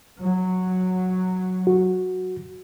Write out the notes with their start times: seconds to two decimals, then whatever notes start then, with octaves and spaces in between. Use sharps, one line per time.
0.20 F#3
1.67 F#4